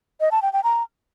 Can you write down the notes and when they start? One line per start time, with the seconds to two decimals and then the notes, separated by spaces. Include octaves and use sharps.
0.21 D#5
0.31 A5
0.42 G5
0.53 G5
0.64 A#5